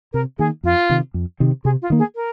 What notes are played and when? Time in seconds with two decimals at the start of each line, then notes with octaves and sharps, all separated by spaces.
0.13 C3 A#4
0.39 D#3 A#3 G#4
0.63 F2 F4
0.89 C3 D#3
1.14 F2
1.40 C3 D#3 C4
1.64 C3 G#4
1.82 F4
1.90 D#3 A#3
1.99 G#4
2.15 A#4